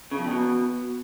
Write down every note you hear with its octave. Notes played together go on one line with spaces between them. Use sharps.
C#3
F2
E2
B2